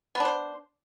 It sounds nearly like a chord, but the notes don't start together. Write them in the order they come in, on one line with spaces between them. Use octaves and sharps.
B3 D4 C5